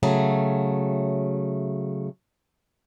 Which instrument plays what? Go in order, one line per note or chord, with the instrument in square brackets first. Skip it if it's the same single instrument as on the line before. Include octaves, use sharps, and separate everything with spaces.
[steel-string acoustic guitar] C#3 F#3 A3